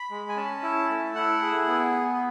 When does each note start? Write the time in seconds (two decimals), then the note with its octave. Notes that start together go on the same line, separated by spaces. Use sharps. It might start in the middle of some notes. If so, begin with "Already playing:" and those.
Already playing: B5
0.11 G#3
0.29 G#5
0.36 C#4 A5
0.63 E4
0.90 A3
1.15 E4 F#5
1.42 G#4
1.68 B3